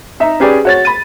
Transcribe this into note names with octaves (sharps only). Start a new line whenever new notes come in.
D#4 E5 A#5
C#4 G4 G#4 B4 D5
F#4 C#5 A6
B5 D#7